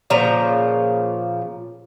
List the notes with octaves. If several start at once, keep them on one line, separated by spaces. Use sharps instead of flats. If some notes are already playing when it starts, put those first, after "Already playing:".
A#2 C#3 F3 A#5